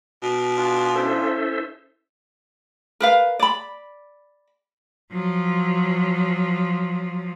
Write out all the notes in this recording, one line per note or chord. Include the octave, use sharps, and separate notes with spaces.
B2
D4 F4 G#4 A5
C#4 E4 A4 C5 E5
A#4 B4 F5
D5 B5
F3 F#3